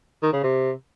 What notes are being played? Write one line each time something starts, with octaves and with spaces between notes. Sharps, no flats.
D#3
C#3
C3